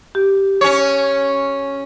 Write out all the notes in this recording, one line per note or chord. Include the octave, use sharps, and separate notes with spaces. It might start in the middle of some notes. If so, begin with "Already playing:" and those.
G4
C#4 C#5